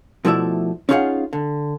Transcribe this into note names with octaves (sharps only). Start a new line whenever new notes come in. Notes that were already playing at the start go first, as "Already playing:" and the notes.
B2 F3 A3 E4 D5 E5
C#4 D#4 F4 G#4 F5 F#5
D3